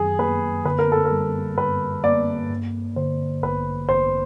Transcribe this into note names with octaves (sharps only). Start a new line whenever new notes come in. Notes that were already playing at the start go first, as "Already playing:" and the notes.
Already playing: F#2 D#3 F#3 G#4
A#3 B4
D3 B4
A#4
A4
A#4
G3
G2 B4
A#3 D5
G2
D3 C5
A1 B4
A1 C5